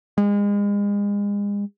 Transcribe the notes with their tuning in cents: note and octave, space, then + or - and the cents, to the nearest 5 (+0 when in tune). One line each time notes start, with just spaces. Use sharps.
G#3 -35